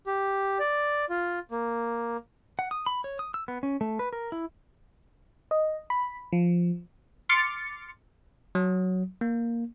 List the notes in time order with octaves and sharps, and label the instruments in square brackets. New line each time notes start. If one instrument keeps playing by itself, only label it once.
[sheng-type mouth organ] G4
D5
F4
A#3
[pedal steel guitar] F#5
D#6
B5
C#5
D#6
E6
B3
C#4
A3
B4
A#4
E4
[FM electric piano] D#5
B5
F3
[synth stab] C6 D6 F6 A6 C#7
[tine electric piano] F#3
A#3